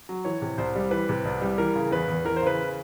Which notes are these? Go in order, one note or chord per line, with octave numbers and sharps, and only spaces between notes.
F#3
E3 C#5
C3
C2 C5
G3
E3 B4
C3
C2
G3
E3 A#4
C#3
E2 B4
E2
E3 A#4
C5
C#3 B4